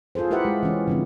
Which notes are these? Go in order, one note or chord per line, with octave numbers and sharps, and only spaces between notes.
F4 G#4 A4 C5
E4 G4 A#4 B4 E5 F#5
G#3
E3 C#4
D3 F3 C4